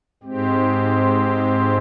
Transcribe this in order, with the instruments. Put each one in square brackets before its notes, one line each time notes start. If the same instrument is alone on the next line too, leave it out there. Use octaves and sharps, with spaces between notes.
[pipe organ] G#2 G#3 C4 G4